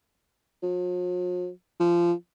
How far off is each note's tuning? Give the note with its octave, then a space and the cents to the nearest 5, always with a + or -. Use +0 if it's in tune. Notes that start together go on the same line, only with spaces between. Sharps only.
F3 +45
F3 -20